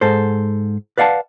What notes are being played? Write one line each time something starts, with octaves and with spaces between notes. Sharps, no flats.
G#2 A4 C5
B4 D5 F5 F#5 A5